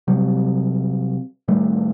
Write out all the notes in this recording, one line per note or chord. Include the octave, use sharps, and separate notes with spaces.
C3 F#3 G3
A2 D#3 G3 A3